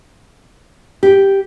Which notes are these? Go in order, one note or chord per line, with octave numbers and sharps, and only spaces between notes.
G4